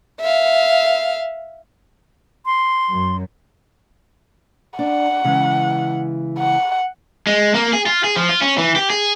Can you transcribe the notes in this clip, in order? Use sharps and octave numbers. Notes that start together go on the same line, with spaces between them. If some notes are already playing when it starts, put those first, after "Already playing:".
E5 F5
C6
F#2
D4 F#5
C#3 E3 G#3
F#5
G#3
A#3
G#4
F4
G#4
F3
F4
C#4
E3
G4
G#4